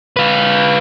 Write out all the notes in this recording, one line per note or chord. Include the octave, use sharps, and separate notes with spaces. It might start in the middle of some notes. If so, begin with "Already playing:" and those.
F4 B4